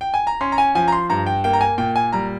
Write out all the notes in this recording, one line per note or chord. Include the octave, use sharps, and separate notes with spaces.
G5
G#5
A#5
C#4 C6
A#5
G#5
F3 G#5
A#5
C6
G2 A#5
G5
A#3 G5
A#5
G#5
A#2 G5
G#5
G3 A#5